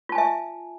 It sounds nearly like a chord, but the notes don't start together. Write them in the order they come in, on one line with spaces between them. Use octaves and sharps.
F4 A5 G#5 E5